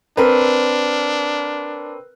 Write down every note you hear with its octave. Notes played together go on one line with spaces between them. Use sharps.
C4 D4 A#4 B4